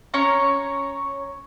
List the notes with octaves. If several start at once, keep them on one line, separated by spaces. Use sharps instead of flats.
C#4 C#5 A#5